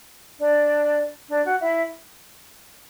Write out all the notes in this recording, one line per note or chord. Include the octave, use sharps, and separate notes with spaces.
D4 D5
D4 D5
F#4 F#5
E4 E5